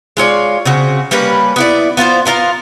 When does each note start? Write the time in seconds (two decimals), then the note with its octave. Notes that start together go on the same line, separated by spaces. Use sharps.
0.17 G#3 F4 C#5 D5
0.65 C#3 C4 F#4
1.11 G3 A#3 C#4 B4
1.56 B3 E4 D5
1.97 B3 F4 B4 C5
2.25 B3 D4 F4 A#4